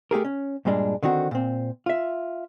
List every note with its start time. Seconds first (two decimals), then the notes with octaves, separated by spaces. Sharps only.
0.11 A3 G4 G#4 A#4
0.24 C#4
0.65 G2 A#2 G3 G#3 D4
1.03 D3 D#3 C4 F#4
1.31 A#2 C4
1.86 F4 E5